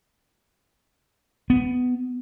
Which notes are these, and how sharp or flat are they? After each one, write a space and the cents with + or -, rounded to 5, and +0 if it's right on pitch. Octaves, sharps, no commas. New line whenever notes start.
B3 +15